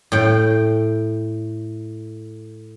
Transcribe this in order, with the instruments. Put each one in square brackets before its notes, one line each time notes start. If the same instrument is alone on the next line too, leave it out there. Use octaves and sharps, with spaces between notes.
[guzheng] A2 G5